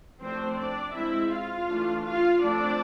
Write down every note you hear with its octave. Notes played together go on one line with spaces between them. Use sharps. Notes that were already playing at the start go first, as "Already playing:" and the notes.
F3 A3 C4 D4 C5
D4 D5
G#3 C4 E4 E5
F4 F5
E3 A3 D4
F4 F5
F3 A3 C4 D4 D5